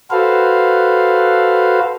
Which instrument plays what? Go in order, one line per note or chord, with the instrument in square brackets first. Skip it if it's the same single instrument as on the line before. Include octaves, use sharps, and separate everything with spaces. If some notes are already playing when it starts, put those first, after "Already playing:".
[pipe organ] F#4 A4 B4 C5 F5